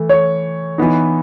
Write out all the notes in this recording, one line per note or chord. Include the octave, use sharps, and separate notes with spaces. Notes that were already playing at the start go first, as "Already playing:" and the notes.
Already playing: E3 A3
C#5
E3 B3 D#4